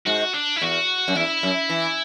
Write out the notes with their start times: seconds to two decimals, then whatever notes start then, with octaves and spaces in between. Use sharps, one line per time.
0.07 G#2 F#4
0.34 D4
0.56 E4
0.62 E2 F#4
1.08 F#2
1.15 E2 E4
1.43 F#2
1.70 E3